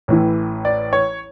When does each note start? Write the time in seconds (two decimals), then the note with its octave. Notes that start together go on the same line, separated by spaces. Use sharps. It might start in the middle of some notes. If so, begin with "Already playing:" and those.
0.08 A1 A2 E3
0.65 D5
0.93 C#5